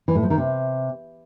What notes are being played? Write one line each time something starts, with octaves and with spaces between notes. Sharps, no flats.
E3
A2
F3
D#3
C3